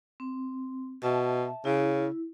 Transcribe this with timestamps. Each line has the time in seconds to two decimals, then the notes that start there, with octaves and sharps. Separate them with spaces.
0.20 C4
1.03 B2 E5 A5
1.65 C#3 E4